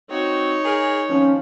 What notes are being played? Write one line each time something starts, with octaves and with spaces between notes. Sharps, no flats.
C4 D#4 F#4 C#5
G#4 A#4
A#2 D#3 F3 C#4